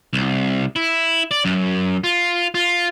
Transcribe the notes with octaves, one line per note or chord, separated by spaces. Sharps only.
C2
E4
D5
F#2
F4
F4